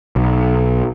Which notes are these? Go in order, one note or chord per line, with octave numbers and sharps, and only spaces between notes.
B1